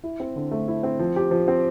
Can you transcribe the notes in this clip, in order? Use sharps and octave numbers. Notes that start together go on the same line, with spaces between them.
E4
C4
D3
A3
E4
C4
F3
G4
F3
C4